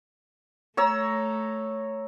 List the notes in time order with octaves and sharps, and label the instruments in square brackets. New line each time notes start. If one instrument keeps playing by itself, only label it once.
[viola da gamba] A3 [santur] C#5 A#5 E6